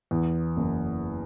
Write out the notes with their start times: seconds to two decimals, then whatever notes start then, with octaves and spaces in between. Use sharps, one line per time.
0.11 E2
0.57 F#1